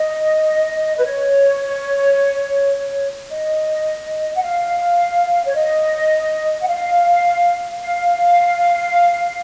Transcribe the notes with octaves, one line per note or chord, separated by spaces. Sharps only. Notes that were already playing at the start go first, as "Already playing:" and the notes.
Already playing: D#5
B4
C#5
D#5
F#5
F5
C#5
D#5
F#5
F5
F5